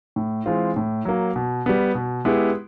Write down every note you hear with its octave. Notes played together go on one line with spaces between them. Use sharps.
A2
E3 G#3 C4 F4
A2
F#3 A#3
B2
G3 B3
B2
G#3 B3 E4 G4